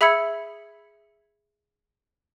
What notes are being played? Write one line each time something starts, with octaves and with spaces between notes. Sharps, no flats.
G#4 E5 B5 E6 G#6 C#7